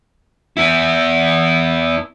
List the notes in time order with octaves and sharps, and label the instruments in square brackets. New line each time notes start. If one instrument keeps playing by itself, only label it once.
[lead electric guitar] B3 E4